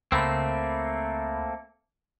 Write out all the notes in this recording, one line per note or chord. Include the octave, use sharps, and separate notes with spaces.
C#2 A3 A#3 C4 B5